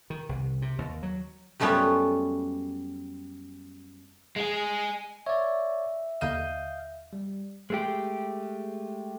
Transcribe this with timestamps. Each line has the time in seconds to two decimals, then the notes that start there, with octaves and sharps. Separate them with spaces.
0.10 D#3
0.29 C2
0.62 C3
0.78 D#2
1.03 F#3
1.60 F#2 G3 A3 B3 C#4 F4
4.36 G#3 G#4
5.26 C#5 D5 E5
6.21 D#2 D3 D#5 F5 G6 D#7
7.13 G3
7.70 G#3 A3 G4